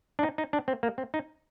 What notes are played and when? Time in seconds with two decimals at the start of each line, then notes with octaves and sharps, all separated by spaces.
0.19 D4
0.23 D#4
0.38 D#4
0.53 D4
0.68 C4
0.83 A#3
0.98 C4
1.14 D#4